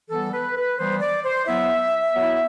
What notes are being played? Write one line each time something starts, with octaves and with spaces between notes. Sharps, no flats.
E3 G3 B3 A4
B4
B4
E3 G3 B3 C5
D5
C5
F#3 B3 E4 E5
F#3 B3 E4